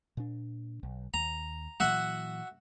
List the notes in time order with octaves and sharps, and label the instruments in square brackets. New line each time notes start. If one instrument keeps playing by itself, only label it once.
[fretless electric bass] A#2 D4
B1
[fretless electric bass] D#2 [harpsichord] A#5
[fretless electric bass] A#2 E3 F#3 [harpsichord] F#4 E5 F#5